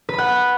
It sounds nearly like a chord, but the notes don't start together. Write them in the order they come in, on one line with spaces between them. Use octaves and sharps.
B4 B5 F#5